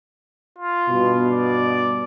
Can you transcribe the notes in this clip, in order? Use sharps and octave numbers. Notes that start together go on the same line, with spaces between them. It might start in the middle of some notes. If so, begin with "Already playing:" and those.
F4
G2 B2
D5